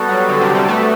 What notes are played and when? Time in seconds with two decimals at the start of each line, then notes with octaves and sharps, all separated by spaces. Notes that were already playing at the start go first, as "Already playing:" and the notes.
Already playing: G3 B3 F#4 A4
0.09 F#3
0.29 D3
0.41 C3
0.55 G3
0.68 A3 B3 F#4 B4